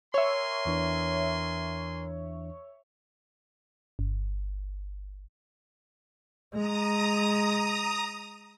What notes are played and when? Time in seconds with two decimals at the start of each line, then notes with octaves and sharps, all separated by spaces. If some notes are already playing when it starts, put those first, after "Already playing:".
0.14 A#4 C#5 E5 G#5 C6
0.65 E2 E3 D4
3.99 G1
6.53 G#3 A#5 D#6